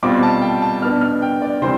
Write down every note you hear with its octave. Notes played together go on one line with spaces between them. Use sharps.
B2 G3 C4 F4 D6
A5
G5
A5
B2 B3 D4 F6
F6
G5
D5
C3 E3 G3 C5